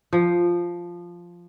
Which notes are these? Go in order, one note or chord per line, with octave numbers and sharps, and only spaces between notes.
F3